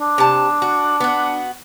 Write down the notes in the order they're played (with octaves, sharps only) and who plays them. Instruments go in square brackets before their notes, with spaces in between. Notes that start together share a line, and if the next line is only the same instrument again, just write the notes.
[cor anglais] D4
[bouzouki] C3 A5
F#4
B3 F#4